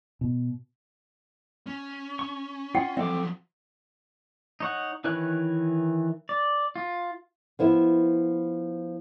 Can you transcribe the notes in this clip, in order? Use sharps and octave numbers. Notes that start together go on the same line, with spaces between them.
B2
C#4
C#6
F4 F#5 G5
F3 F#3 C4 A4 E5 D6
D#4 C#5 F#5
D#3 E3 B4 C#5 F#6
D5
F4
F3 B3 E4